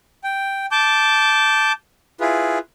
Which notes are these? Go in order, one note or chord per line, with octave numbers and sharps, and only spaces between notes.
G5
A5 D6 G6
E4 F4 G#4 B4